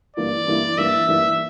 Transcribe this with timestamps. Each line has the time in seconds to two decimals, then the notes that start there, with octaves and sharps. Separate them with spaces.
0.16 G2 E3 A#3 E4 D5
0.47 G2 E3 A#3 E4
0.78 G2 E3 A#3 E4 E5
1.08 G2 E3 A#3 E4